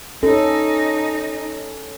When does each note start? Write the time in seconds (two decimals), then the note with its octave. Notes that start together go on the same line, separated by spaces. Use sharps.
0.23 C#4 D#4 A4